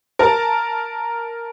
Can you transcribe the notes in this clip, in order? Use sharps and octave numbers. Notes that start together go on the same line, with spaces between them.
A#4 A5